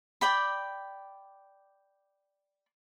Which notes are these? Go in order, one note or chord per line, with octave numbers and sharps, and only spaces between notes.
D5 G5 B5